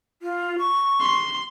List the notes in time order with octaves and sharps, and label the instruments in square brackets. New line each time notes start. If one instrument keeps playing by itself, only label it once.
[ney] F4
C#6
[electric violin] C6